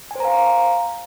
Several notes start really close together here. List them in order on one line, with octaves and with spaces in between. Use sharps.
G#5 C5 A#5 F5